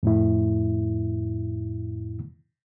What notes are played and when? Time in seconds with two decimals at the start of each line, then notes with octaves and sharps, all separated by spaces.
0.03 F2 A2 E4